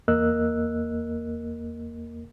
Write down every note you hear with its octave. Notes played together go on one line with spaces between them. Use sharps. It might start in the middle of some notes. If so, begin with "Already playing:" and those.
E2 A#3 A#4 D#5 E6 F#6